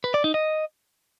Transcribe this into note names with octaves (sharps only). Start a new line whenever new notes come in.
B4
D5
D#4
D#5